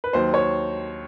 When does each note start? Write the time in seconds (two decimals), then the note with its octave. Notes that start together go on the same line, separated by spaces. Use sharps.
0.04 B4
0.13 D#2 D#3 F#3 C5
0.34 C#5